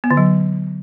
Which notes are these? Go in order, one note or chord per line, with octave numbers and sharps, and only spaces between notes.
B3
D3
F#3